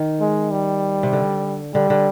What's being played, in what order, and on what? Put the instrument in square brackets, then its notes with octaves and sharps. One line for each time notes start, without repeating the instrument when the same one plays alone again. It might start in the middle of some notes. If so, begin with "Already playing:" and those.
Already playing: [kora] D#3
[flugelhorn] G#3
G3
[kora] C3
D3
[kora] D3 [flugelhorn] G3
[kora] D3